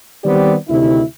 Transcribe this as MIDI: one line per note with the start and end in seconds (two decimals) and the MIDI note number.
0.24 0.53 51
0.24 0.53 55
0.24 0.53 59
0.24 0.53 60
0.24 0.53 67
0.24 0.53 74
0.69 1.02 38
0.69 1.02 48
0.69 1.02 51
0.69 1.02 64